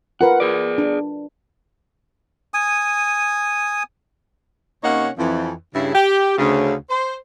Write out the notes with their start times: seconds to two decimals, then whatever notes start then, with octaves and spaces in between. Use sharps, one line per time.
0.21 F4 A#4 B4 F#5
0.40 G#4 D5
0.78 D4
2.54 G#5 D#6
4.84 C3 A#3 C#4 D#4 C#5 F#5
5.18 F2 E3
5.74 G2 C#3 E4
5.94 G4
6.37 D2 C#3
6.89 C5